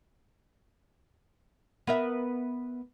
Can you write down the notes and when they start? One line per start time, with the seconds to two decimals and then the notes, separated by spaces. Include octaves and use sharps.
1.87 B3 A#4 E5